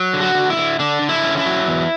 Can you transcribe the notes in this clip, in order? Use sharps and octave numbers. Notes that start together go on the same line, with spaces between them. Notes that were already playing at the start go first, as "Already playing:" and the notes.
Already playing: F#3
D3
F#4
D3
E4
D3
D3 D4
D3
E4
C#4
E4
F#3
E2